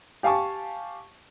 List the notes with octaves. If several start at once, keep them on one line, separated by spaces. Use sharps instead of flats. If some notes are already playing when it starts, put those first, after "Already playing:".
G4 F5 G#5 A5 C#6